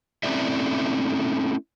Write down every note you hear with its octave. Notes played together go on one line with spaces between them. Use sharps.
A3 C4 C#4 E4 D5 E5